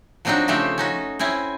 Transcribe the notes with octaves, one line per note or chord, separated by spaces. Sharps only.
F3 F#3 C4 D4 D#4 F#4
C#3 F3 A3 C4 G4
C#4 D#4 F#4
C4 C#4 E4 G#5